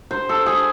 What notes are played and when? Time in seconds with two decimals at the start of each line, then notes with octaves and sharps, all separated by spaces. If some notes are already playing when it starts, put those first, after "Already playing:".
0.11 C5
0.29 A4
0.46 G#4